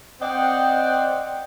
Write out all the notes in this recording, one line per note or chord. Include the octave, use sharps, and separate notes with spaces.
C4 C5 D5 D#5 F#5 G5